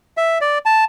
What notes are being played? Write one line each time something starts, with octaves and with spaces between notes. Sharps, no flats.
E5
D5
A5